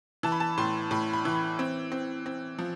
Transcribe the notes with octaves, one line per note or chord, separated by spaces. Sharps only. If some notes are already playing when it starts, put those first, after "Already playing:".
E3 A5
B5
A5
A2 C6
A2 B5
B5
E3
C4
C4
C4
F3